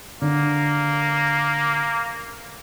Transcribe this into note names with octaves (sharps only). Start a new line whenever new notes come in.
D3 A#3